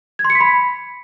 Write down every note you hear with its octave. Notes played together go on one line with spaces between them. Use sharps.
G#6
C6
C#7
B6
B5